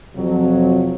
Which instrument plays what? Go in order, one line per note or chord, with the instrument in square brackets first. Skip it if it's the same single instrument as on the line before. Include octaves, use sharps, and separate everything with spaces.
[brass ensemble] F2 C3 F3 F#3